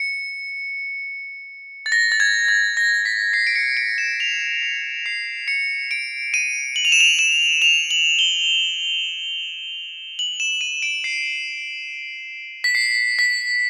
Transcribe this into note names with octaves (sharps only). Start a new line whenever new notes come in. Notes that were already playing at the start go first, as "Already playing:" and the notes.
Already playing: C#7
A6
A#6
A6
G#6
A6
A#6
B6
C7
D7
C#7
D7
E7
F7
C#7
C7
C#7
D7
D#7
F#7
F7
E7
F7
E7
F7
F#7
G7
F#7
E7
D#7
D7
C7
B6
C7
B6